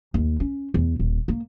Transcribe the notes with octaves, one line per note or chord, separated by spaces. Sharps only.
D#2
C#4
E2
D#1
A#3